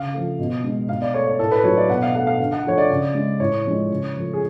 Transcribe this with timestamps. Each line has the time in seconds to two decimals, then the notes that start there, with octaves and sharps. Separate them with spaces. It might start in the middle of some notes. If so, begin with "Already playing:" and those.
Already playing: C#3 F5
0.13 F3 A3
0.39 B2
0.64 G#3
0.89 B2 F5
1.02 D5
1.14 A3 C#5
1.27 C#5
1.39 A2 A4
1.51 B4
1.64 F#3 A3 C#5
1.77 D5
1.90 B2 F#5
2.02 F5
2.15 A3 F#5
2.27 F5
2.40 D3
2.53 F#5
2.65 F3 A3 C#5
2.78 D5
2.90 C#3
3.15 G#3
3.40 A2 C#5
3.65 F3 G#3
3.90 C#3
4.15 F3 A3
4.33 G#4